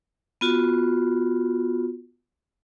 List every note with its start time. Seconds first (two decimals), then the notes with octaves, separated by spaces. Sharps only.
0.41 B3 F4 F#4